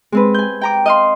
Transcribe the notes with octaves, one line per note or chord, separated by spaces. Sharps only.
G#3 C4 B4
G#5 G6
G5 A#5 D6
D#5 F5 C6